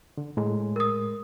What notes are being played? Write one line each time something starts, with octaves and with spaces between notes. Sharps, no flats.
D3
A2 G#3
A#4 D#6